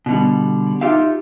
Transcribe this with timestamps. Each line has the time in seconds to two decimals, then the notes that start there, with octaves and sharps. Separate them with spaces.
0.06 B2 D3 G3
0.81 D#4 F4 G4 E5 F5